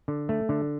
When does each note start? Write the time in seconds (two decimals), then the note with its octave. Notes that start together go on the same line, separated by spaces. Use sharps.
0.08 D3
0.29 A3
0.49 D3